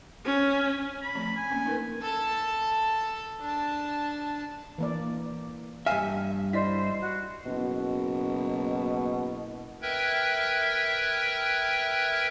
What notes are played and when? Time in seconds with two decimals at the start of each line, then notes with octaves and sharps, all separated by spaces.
0.25 C#4
1.01 B5
1.15 F3 A3 C4
1.37 G#5
1.51 A#3 C4 C#4
1.66 D#4 A#4 B4
2.02 A4 A5
3.41 D4 A5
4.78 E3 A#3 D5
5.86 G2 E5 F5 G#5 F6
6.53 E4 C5 D5 D#5 B6
7.00 F#4
7.46 F#1 B2
9.82 A#4 B4 E5 G5 F#6 G#6